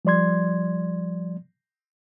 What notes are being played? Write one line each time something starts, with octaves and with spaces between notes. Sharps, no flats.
F3 G3 D5 C6 G#6